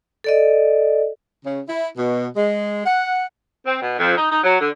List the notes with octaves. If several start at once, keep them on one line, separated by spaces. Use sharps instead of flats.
A4 D5 D#5
C#3
E4
B2
G#3
F#5
C4
B2
F2
D#4
D#4
F#3
D3